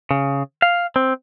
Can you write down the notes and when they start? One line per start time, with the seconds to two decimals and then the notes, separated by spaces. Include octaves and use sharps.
0.11 C#3
0.62 F5
0.96 C4